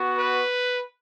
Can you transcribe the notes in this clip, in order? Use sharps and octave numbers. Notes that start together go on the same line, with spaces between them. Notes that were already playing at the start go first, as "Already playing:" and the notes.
Already playing: B3 F#4
B4